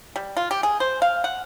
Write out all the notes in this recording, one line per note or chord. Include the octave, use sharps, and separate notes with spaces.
G3
F4
G4
G#4
C5
F5
F#5